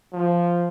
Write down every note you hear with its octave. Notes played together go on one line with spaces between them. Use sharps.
F3